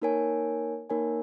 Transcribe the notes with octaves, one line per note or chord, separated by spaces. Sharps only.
A#3 D#4 A#4 C#5 G#5
A#3 D#4 A#4 C#5 G#5